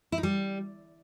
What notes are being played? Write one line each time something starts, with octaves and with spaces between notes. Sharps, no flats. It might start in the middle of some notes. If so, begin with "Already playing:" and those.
E4
D#4
G3